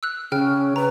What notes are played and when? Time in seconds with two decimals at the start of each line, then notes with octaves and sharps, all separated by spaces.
0.03 E6 F#6
0.32 C#3 C#4 G5 F6
0.76 B4 A#5